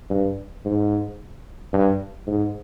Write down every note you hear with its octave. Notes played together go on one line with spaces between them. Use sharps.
G2
G#2
G2
G#2